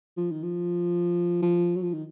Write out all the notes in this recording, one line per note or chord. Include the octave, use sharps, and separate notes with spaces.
F3
D#3
F3
F3
F#3
F3
D#3